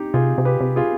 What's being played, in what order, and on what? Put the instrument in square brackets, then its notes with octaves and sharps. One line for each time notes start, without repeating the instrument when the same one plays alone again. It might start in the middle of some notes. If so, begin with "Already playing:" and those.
Already playing: [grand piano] D#4 G4
[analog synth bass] C3 [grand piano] F4 G#4
[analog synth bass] C3
[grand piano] G4 B4
[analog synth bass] C3
[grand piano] F4 G#4